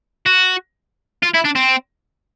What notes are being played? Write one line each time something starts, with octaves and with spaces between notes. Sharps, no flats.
F#4
F4
E4
D4
C4